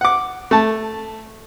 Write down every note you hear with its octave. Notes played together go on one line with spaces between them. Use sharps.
F#5 D6
A3 A5